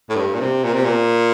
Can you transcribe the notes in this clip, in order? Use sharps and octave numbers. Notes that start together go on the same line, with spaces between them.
A2
G2
A#2
C3
A#2
C3
A#2